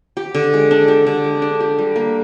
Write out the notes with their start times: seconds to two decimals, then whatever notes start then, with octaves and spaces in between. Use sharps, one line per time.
0.17 G4
0.35 D3
0.54 G#3
0.71 D4
0.88 G4
1.06 D3
1.24 G#3
1.42 D4
1.60 G4
1.78 G3
1.96 A#3